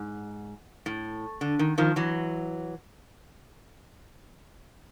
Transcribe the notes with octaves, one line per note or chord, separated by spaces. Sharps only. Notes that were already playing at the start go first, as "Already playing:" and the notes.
Already playing: G#2
A2
D3
D#3
D#3 F3
E3 F#3